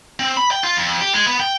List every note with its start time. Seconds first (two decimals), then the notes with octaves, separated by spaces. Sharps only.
0.19 C4
0.37 B5
0.51 G5
0.64 F4
0.77 F2
1.01 G4
1.14 G#3
1.26 B3
1.40 G5